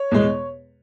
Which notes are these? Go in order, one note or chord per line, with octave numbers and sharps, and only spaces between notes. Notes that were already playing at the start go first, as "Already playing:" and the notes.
Already playing: C#5
E2 B2 G#3